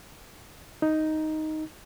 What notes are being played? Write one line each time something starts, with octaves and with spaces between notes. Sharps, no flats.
D#4